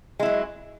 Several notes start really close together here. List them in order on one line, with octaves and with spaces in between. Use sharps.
G#3 E4 F#3